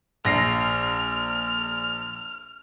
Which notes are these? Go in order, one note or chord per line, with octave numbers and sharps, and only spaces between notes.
A#1 F6 A#6 C7